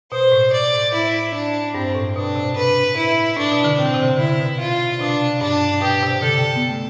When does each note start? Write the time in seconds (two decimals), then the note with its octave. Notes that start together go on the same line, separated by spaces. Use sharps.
0.12 B2 C5
0.32 A2
0.52 A2 D5
0.74 A2
0.94 E4
1.34 D4
1.74 G2 C4
1.95 A2
2.16 B2 D4
2.36 C3
2.56 A2 B4
2.97 E4
3.37 A2 D4
3.51 B2
3.64 D3
3.78 C3 C4
3.86 D3
3.94 C3
4.02 D3
4.10 C3
4.19 D3 E4
4.40 B2
4.60 F4
4.92 C3
5.01 B2 D4
5.41 G2 D4
5.82 B2 G4
6.02 C3
6.22 D3 A4
6.56 B3
6.69 A3